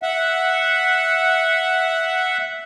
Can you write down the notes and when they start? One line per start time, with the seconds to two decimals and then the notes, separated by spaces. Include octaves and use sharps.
0.03 E5 F#5